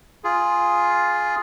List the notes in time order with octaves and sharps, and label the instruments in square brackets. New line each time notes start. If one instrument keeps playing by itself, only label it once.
[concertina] F4 G#4